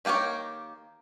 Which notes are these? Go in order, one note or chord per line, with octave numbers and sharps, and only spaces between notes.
D#3 A#3 G4 A#4 C#5